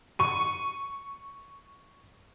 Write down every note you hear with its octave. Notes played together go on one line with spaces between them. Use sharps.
C#6 D#7